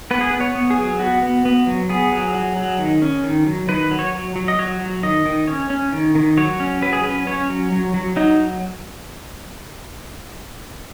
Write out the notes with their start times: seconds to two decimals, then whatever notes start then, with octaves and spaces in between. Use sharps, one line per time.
0.11 B3 B4
0.21 G#4
0.31 B3 B4
0.41 C#5
0.55 B3
0.70 G#4
0.78 F#3
1.00 B3 F#4
1.23 B3
1.45 B3
1.67 F#3
1.89 B3 G#4
2.12 F#3
2.35 F#3
2.57 F#3
2.79 D#3
3.02 C#4
3.24 D#3
3.47 F#3
3.69 D#3 B4
3.91 F#3
3.99 C#5
4.14 F#3
4.36 F#3
4.48 D#5
4.58 F#3 C#5
4.81 F#3
5.03 D#3 D#5
5.26 D#3
5.47 C#4 C#5
5.70 C#4
5.93 D#3
6.15 D#3
6.37 F#3 C#5
6.60 C#4
6.82 F#3 B4
6.93 G#4
7.03 C#4 B4
7.27 C#4 C#5
7.50 F#3
7.72 F#3
7.94 F#3
8.16 F#3 D#4